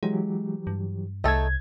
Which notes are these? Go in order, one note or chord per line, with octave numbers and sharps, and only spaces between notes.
E3 F#3 G#3 G4
G2
C2 A3 D#4 A4 G#6